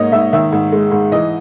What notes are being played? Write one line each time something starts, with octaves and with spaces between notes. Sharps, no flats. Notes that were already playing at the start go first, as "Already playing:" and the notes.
Already playing: G#2 A#3 C#5 D#5
G#2 E5
D#3 E5
G#2
G#3
G#2
E3 D#5